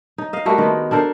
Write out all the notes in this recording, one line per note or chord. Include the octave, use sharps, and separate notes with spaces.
D#4
D#5 F5
G3 A3 A#3 F#4
D#3 G#3 B3
D4 A4 A#4 C5